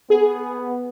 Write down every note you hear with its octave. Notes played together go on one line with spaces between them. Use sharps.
B3 G#4